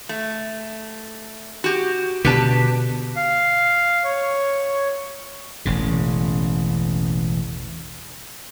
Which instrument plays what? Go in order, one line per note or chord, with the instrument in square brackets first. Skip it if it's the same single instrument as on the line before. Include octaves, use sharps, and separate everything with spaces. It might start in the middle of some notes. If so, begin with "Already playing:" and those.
[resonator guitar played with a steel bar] A3
F#4 G4
[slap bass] B2 D3 [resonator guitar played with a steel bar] G4 B4 A5
[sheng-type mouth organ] F5
C#5
[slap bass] E1 A1 C#3